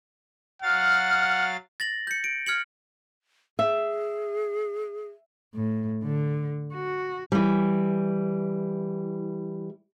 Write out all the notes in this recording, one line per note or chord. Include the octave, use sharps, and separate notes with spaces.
F#3 F5 F#5 F6 A6
A6 A#6 F#7
G6 C#7
D7
F6 G#6 C#7 F#7
G#4 E5
A2
D3
F#4
E3 G3